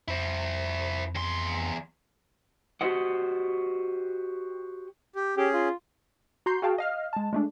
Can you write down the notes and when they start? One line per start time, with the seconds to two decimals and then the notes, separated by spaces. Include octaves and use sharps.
0.08 F2 E4 C5
1.15 E2 C6
2.81 F#4 G4 C5 D#5 F#5
5.16 G4
5.37 C#4 G4 G#4
5.53 F4
6.46 F#4 A#5 C6 G6 C7
6.62 F#4 G#4 F5 G5 A5
6.78 D#5 F5 F6
7.13 G#3 A5
7.33 G#3 A3 D4